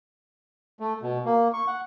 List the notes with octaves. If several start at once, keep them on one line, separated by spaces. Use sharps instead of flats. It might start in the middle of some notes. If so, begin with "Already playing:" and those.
A3
B2
A#3
C#6
F#5